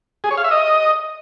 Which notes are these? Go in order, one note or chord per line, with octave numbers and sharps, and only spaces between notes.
G#4
C#5
F5
E5
D#5